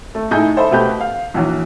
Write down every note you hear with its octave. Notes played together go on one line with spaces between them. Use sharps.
A3 A4
A2 D#4 E4 G#4 A5 G6
A4 C5 D#5 E5 B5
B2 A3 G4 B4 G6
F5
A#1 E3 F#3